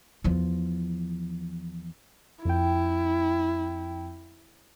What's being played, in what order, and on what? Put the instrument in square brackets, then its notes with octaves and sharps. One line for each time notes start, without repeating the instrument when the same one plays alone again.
[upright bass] E2 F3
[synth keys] F2 G5 [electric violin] E4